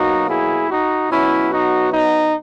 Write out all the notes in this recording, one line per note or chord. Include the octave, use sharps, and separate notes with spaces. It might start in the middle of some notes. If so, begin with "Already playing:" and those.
Already playing: B2 F#3 A#3 D#4 F#4
E4 G#4
D#4 F#4
B2 F#3 B3 C#4 E4
D#4 F#4
D#4